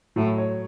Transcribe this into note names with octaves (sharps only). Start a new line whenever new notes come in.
A2 F#3
C#5